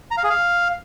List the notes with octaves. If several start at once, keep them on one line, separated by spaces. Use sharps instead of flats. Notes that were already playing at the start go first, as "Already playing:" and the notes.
A#5
F5
G#4
F5